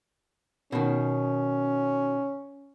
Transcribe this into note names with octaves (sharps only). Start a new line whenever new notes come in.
B2 D#3 C#4